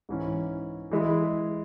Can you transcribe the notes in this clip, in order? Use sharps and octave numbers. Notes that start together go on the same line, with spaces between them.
G#2 E3 C#4
E3 G#3 E4